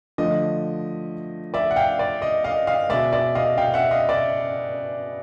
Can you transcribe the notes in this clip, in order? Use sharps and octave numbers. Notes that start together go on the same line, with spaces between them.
D3 F3 A3 D#5
D5 E5
F#5
F5 G5
D5
D#5
D#5 F5
D#5 F5
B2 G#3 D5 E5
D5 E5
D#5 F5
F5 G5
E5 F#5
D#5 F5
D5 E5